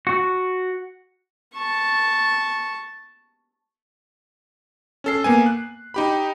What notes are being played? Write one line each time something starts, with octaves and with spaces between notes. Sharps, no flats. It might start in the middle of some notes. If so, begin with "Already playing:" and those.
F#4
A5 C#6
C#4 A4 C7
A#3 B3 G#5
F#6
D#4 G4 B5